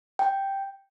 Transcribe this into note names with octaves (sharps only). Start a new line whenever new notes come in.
G5